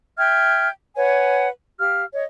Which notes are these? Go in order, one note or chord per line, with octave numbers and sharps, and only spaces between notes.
E5 G5 F6 G#6
B4 C#5 F#5 G#5
G4 F5 F6
C#5 D#5